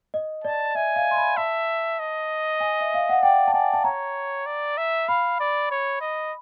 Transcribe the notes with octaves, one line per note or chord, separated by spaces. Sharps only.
D#5
D5 A5
E5 G#5
F5
C6
B5
E5 A5
D#5
G#5
E5
F5
F#5
D5 G5
A5
D5 G#5
A5
C#5 A#5
D5
E5
F5 B5
D5
C#5
D#5